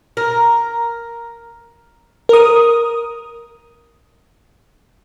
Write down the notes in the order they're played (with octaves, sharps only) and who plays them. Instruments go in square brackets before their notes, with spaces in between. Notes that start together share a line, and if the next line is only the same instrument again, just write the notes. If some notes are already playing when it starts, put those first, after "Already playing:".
[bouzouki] A#4
[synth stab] A#4 D#6